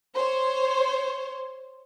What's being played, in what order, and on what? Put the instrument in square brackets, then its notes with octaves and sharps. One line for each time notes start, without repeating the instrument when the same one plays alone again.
[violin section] C5 C#5